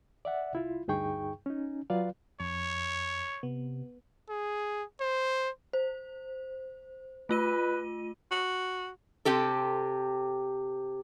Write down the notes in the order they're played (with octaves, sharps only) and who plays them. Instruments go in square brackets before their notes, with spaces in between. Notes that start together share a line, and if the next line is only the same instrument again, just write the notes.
[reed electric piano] D5 E5 F#5
C2 E4 F4
D2 G2 D#4 G#4 G5 C#6
C#4 D#4
F#3 F4 B4 D5 F5
[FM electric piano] F2 [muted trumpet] C#5
[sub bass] C3 [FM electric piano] B3
[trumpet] G#4
C5
[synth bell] C5
[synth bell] A3 F4 D#7 [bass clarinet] B4
[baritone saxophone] F#4
[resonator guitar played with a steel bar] C3 C4 G4 A4